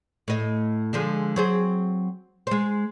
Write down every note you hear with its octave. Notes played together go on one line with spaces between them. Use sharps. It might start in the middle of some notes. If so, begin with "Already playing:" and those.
A2 D#5
D3 F3 G#3
F#3 C4 G#4
G#3 C5